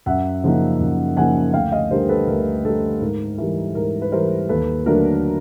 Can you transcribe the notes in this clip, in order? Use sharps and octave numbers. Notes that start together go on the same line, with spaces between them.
F#2 E5 F#5
C#3 F3 A#3 D#4
F#2
C#3 F3 A#3 D#4 F#5 G#5
D2 F5 G5
D#5 F5
D3 G3 A#4 C5
A4 B4
D2 A#4
D3 G3 A4
G#2 A#4
E3 G3 A#4
G#2 A#4
B4
E3 G3 A#4 C5
D#2 A4 B4
D3 F#3 A3 D4 A#4